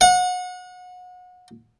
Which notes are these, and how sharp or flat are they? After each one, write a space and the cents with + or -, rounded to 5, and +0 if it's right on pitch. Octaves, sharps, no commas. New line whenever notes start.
F#5 -30